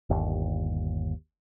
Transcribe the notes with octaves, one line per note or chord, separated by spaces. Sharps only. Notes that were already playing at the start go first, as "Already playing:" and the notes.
G1 D#2